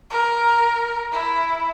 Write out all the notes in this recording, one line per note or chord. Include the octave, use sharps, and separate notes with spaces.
A#4
E4